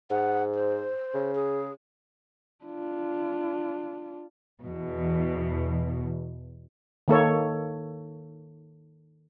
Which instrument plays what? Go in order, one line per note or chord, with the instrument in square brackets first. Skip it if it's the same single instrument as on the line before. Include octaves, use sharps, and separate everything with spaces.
[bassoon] G#2 [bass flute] F#5
[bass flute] C5
[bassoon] C#3
[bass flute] G#4
[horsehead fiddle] D4 F4
[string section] E2 B2
[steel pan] D#3 A#3 A4 C#5